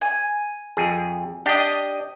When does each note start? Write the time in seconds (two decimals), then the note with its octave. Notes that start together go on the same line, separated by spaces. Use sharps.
0.01 G#5
0.77 F2 G#4
1.46 D4 G4 D#5